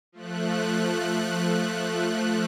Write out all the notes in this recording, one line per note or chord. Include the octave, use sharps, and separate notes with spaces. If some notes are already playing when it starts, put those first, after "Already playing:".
F3 A3 F#6